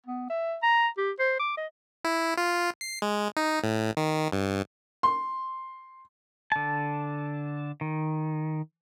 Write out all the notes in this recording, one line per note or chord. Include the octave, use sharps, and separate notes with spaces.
B3
E5
A#5
G4
C5
D6
D#5
E4
F4
C7
G#3
D#4
A2
D#3
G2
C6
D3 A5
D#3